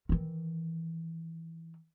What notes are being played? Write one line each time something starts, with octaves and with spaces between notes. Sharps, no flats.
D#3 E3